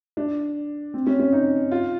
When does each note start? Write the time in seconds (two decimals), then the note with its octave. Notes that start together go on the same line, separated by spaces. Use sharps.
0.17 D4
0.94 C4
1.07 C#4
1.20 C#4
1.33 D#4
1.72 F4